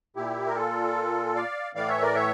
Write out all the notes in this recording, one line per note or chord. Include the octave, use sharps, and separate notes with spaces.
A#2 E4 G4
A#4
F4 A4
D5 F5
A2 E3 D5 F5
C#5 E5
A#4 D5
C#5 E5